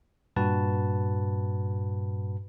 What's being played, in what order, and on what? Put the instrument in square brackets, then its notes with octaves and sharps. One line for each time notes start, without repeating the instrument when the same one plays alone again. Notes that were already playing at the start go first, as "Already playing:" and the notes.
[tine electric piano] G2 A#2 F#4 B4 A5